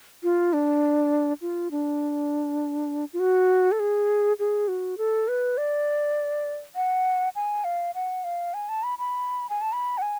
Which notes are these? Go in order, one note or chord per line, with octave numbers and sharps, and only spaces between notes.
F4
D4
F4
D4
F4
F#4
A4
G#4
G#4
F#4
A4
B4
D5
F#5
G#5
F5
F#5
F5
G#5
A5
B5
B5
G#5
A5
B5
F#5
G#5